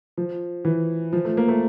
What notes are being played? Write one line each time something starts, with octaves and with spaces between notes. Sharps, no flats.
F3
E3
F3
A3
A#3
A3